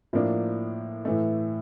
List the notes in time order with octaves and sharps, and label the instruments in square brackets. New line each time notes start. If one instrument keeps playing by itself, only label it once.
[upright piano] A2 F3 A#3 D4
A2 E3 A3